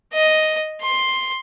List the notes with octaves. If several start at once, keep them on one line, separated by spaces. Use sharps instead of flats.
D#5
C6